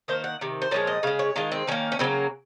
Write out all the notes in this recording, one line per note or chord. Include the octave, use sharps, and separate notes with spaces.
D#3 A#3 C5
F#5
C3 D#3
C5
A#2 F3 G#3 C#5
D#5
C#3 G#3 F5
C#5
D#3 G#3 F4
C4
D#3 A#3 C#4
C#4
C#3 F#3 A#3 C4